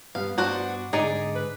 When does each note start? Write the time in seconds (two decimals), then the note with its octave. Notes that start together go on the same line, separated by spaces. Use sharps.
0.15 G2 G3 B3 F5
0.38 G2 D4 F#4 C5
0.93 G#2 D3 D#4 G#4 D5
1.35 B4